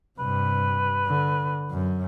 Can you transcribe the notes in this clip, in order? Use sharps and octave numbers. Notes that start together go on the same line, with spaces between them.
G2 C3 B4
D3
F#2